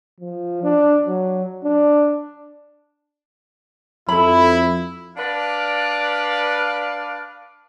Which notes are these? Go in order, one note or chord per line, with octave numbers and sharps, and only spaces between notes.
F3
D4
F#3
D4
F2 E4 A4 B5
D4 B4 D5 F5